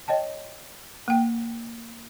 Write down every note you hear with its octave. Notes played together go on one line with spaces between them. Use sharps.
C#5 D#5 G5 A5
A#3 G5